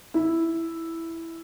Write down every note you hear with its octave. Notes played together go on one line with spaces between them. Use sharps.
E4